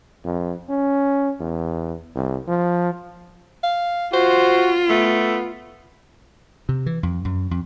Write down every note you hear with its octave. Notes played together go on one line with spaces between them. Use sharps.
F2
C#4
E2
C2
F3
F5
F4 F#4 C5
A3 B3
C3
E3
F2
F#2
F2